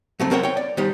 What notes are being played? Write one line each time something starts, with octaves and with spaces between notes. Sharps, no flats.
F#3 A3 C4
C4 A#4 C5 C#5 F#5 G5
C#5 G5
D5
D#3 G3 G4 C5